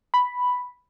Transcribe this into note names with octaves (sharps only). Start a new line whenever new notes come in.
B5